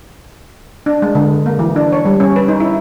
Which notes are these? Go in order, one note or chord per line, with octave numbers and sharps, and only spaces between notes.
D4
G#3
D3
A#3
E3
D4
C#5
G3
C#4
B4
D#4
E4